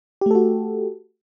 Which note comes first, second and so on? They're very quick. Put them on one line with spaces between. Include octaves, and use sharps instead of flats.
G4 A3 A4 F#4